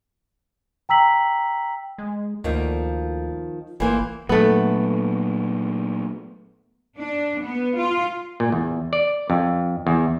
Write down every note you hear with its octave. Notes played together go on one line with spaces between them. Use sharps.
G5 A#5 E6 B6 F#7
G#3
D2 D#3 F3 A#3
G1 E3 A#3 C5
A#2 F#3 A3 B3
D4
B3
F4
A#2
E2
D5
F2
E2